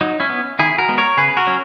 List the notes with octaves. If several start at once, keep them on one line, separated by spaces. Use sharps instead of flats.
F#3 D#4
C#4 E4
B3
D#3 E4 G#4
F#4 A#4
G#3 B3
A#4 C#5
C#3 G#4 B4
F#4 A#4
F#3 C#4